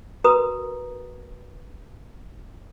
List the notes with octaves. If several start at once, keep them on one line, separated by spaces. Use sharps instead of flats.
F#4 A#4 B4 A#5 D#6